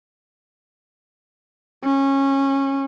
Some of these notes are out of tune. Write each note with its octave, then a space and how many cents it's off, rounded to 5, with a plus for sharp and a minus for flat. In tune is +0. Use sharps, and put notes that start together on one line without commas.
C#4 -20